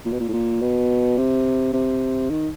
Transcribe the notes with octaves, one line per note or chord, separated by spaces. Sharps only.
A#2
B2
A#2
A2
A#2
B2
C3
C3
D#3